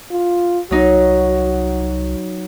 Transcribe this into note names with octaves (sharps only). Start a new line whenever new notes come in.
F4
C2 F#3 D#4 F#4